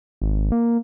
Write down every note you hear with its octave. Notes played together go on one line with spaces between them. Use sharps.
G#1
A#3